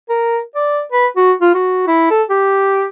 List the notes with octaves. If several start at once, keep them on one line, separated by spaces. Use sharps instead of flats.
A#4
D5
B4
F#4
F4
F#4
E4
A4
G4